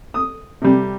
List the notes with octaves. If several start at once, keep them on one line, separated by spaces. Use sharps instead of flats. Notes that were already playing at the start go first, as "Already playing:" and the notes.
D#6
C3 G3